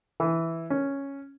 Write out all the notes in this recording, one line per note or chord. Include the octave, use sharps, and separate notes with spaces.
E3
C#4